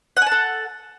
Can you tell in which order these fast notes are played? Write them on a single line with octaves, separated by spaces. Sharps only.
F#5 G#5 A5 A4